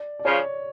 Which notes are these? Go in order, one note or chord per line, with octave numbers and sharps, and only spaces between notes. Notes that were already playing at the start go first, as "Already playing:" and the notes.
Already playing: D5
D5
C#3 F3 C#5